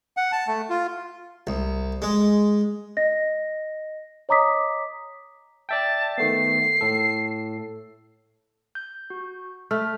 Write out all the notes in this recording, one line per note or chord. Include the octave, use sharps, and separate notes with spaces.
F#5
A5
A3
F4
C2
G#3
D#5 A#6
C#5 D#5 A#5 D6 D#6 B6
D5 E5 G5 A5
D#3 A3 B3 C7
A2 A4
G6
F#4
A3 E5 F6